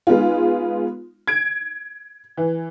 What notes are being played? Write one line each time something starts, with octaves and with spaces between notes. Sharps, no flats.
G#3 B3 D#4 F4
G#6 D7
E3